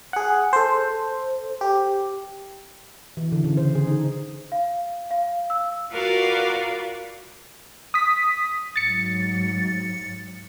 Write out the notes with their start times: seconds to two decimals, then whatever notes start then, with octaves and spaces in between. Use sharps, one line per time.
0.13 G#4 F#5
0.53 A4 C5
1.61 G4
3.17 E3
3.32 D3
3.44 C#3
3.57 C5
3.75 G#4
3.87 D#4
4.52 F5
5.11 F5
5.50 E6
5.92 F4 F#4 A#4 B4 D5 F5
7.94 D#6 B6
8.76 G#2 F#3 A6 C#7